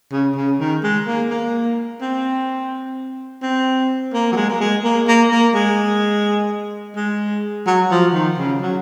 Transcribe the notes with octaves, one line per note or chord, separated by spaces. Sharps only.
C#3
C#3
D#3
G#3
A#3
A#3
C4
C4
A#3
F#3
G#3
A#3
G#3
A#3
A#3
A#3
G#3
G#3
F#3
F3
D#3
C#3
F#3